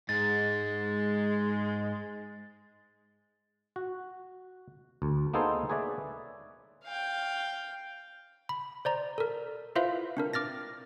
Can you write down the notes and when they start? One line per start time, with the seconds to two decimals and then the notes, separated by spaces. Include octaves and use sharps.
0.09 G#2 G#3 A6
3.76 F#4
5.02 D2
5.34 A#3 B3 D#4 G#4 A4 C5
5.70 G#4 B4 C#5 D5 E5
6.84 F5 G5
8.49 B5
8.85 C5 D5 A#5
9.18 A4 A#4
9.75 E4 F4 B4 C5 E5 F5
10.17 C4 D4 A#4
10.33 D6 F6 A6 A#6